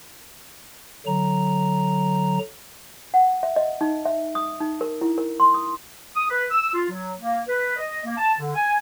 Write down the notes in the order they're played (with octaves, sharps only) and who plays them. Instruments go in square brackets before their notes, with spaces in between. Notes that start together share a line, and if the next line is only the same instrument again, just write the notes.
[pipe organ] D3 F#3 A#5
[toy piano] F#5
E5
D#5
D#4
E5
D#6
D#4
A#4
E4
A#4
C6
D#6
[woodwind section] D#6
B4
E6
F4
F#3
A#3
B4
D#5
A#3
A5
D3
G#5